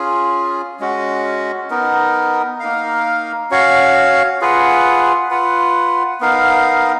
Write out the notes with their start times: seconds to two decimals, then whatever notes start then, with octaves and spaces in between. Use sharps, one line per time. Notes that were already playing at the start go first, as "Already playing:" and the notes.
Already playing: C#4 F4 G#4
0.80 G#3 C#4 F#4
1.70 B3 D#4 A#4
2.60 A#3 D#4 A#4 F5
3.51 C#4 F#4 C#5 F5
4.41 F4 G#4 B4 F#5
5.31 F4 B4 F#5
6.20 B3 D#4 A#4 F5